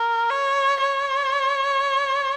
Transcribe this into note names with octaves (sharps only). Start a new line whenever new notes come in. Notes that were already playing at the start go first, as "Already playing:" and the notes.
Already playing: A#4
C#5
C#5